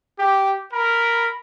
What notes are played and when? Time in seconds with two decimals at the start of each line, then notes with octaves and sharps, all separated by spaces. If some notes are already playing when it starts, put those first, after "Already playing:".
0.19 G4
0.73 A#4 B5